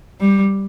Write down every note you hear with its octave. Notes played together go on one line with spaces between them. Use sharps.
G3